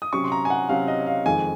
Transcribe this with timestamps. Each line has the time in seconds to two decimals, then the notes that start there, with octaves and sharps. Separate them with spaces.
0.02 D#6
0.13 C3 F#3 C#4 C#6
0.24 C6
0.32 A#5
0.45 G#5
0.50 F#5
0.69 C3 F#3 C#4 F5
0.88 D#5
1.07 F5
1.25 F2 D#3 G#3 G#5